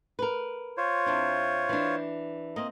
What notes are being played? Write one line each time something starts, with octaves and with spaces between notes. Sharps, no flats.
A#4 B4
F4 C5 C#5
E2 C4 D4
E3 D4
A#3 C4 D#5